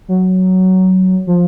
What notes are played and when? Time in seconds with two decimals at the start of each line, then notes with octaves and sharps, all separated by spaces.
0.08 F#3
1.27 F3